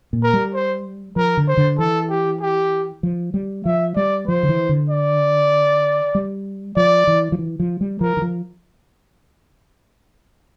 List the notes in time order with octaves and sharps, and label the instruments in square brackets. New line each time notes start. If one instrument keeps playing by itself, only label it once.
[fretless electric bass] A#2
[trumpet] A#4
[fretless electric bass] G3
[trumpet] C5
[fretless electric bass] F3 [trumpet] A#4
[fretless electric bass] D3
[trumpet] C5
[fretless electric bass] D3
[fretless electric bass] E3 [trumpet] A4
[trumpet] G4
G4
[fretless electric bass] F3
G3
[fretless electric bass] F3 [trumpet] E5
[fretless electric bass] G3 [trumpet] D5
[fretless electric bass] F3 [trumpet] C5
[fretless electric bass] D3
E3
D3
[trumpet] D5
[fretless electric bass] G3
[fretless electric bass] F3 [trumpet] D5
[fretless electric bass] E3
F3
E3
F3
G3
[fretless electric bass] F3 [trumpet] A#4
[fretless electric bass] E3
F3